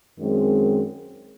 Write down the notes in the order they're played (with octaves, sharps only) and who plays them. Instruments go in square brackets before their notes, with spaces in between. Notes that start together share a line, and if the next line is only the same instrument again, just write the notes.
[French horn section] F#2 D#3 G#3 C4